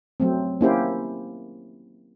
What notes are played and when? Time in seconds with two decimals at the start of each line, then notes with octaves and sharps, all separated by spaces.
0.20 F#3 A3 C4
0.61 A#3 C#4 E4 G4 C5